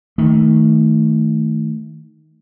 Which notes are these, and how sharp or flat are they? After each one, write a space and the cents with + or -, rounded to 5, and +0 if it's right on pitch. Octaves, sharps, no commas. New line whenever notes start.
D#3 +15 A3 +0